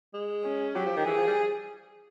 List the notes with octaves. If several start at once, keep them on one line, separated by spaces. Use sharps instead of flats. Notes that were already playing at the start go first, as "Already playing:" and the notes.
G#3
C#4
F#3 G4
F3
D#3
E3 G#4
F3
G3